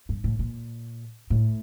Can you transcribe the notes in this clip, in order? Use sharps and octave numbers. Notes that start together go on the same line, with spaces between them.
G2
A2
A#2
A2